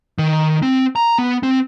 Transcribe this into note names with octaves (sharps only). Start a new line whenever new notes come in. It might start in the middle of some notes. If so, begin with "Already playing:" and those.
D#3
C4
A#5
B3
C4